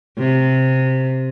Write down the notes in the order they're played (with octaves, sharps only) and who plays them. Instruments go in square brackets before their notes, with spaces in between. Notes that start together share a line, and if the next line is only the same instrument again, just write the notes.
[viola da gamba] C3